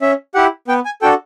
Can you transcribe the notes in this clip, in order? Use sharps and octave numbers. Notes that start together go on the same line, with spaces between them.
C#4 E5
E4 G4 F#5
B3 G5
G#5
D4 F#4 A4 G5